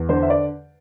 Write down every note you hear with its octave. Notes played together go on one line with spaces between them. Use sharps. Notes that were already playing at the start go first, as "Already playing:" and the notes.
Already playing: E2
D3 C5
E5
D5